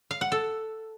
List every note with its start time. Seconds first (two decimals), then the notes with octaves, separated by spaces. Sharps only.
0.11 F5
0.21 F#5
0.32 A4